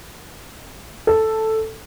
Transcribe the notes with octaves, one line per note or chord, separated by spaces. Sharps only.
A4